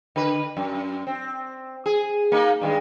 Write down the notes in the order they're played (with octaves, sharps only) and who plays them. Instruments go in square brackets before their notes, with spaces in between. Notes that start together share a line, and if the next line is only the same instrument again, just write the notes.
[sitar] D3 B4
F#2
C4
G#4
A#3 D#4
G2 D#3 G#3